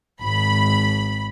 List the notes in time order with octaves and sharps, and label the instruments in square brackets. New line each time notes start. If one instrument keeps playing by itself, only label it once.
[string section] G#1 B5